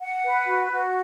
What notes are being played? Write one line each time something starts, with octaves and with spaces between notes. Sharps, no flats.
F#5
B4
F#4
F#4